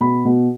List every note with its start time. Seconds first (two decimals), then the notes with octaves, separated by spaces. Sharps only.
0.01 B2 B5
0.25 B2